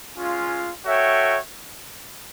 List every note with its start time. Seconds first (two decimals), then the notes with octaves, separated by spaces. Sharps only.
0.17 G#3 C#4 F4
0.84 F#4 A4 C#5 E5 G5